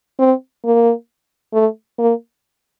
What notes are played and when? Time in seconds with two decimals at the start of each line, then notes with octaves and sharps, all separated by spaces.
0.19 C4
0.65 A#3
1.53 A3
1.98 A#3